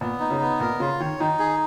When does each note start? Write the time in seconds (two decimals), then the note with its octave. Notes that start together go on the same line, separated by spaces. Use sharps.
0.01 A#2 B3
0.20 D#4
0.31 C#3
0.40 B3
0.60 A#2 A#4
0.80 C#3 F4
0.99 D#3 C#5
1.20 D#3 D#4
1.39 G#4